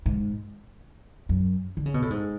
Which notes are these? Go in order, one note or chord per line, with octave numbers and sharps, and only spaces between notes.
G#2
F#2
D3
C#3
B2
A2
G#2